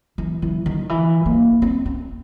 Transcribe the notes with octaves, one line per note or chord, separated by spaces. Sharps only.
E3
E3
D#3
E3
A#3
C4
C4